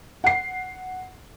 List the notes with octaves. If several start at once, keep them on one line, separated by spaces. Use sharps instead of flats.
F#5 C7